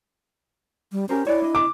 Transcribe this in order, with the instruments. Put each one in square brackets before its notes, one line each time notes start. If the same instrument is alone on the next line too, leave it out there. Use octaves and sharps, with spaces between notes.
[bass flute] G3
[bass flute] C#4 [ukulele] G4 A#4 C5
[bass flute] E4 [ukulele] C#5 D5
[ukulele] D4 D#5
[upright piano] D6